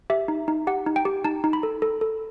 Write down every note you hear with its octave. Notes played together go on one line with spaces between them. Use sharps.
G4 E5
D#4
D#4
G4 F#5
D#4
G5
G4
D#4 A5
D#4
B5
A4
A4
A4